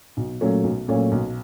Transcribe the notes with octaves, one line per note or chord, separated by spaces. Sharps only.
B1
A#2 F#3 A3 C#4
B1
A#2 F#3 A3 C#4
B1